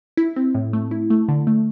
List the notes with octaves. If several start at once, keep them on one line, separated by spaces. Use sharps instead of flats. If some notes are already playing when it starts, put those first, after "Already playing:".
E4
C4
A2
A3
E4
A3
D3
A3